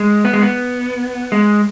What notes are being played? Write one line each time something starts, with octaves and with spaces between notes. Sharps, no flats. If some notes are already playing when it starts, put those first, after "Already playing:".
Already playing: G#3
B3
G#3
B3
G#3